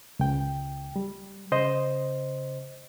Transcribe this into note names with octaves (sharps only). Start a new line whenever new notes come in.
C#2 G5
G3
C#3 C5 D#5